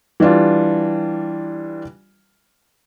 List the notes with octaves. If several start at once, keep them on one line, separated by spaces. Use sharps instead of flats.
E3 G3 D4 F4